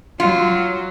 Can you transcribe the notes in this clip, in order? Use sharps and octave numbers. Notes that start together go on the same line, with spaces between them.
F#3 F4